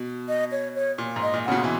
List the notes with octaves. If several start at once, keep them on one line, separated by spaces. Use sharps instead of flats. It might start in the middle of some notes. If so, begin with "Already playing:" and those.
Already playing: B2
D#5
C#5
C#5
A#2
G#2
D#5
A#2
C#3 F#5
B2
E3